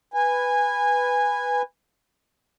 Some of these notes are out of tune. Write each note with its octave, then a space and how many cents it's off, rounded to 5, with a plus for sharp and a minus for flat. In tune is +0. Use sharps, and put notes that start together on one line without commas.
B4 +0 G#5 -15